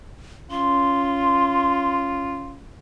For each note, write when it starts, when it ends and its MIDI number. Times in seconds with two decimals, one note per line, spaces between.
0.51 2.67 61
0.51 2.57 65
0.51 1.96 84